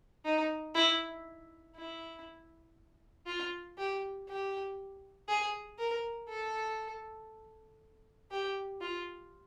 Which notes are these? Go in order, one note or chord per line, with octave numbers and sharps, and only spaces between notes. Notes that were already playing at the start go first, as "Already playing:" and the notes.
D#4
E4
E4
F4
G4
G4
G#4
A#4
A4
G4
F4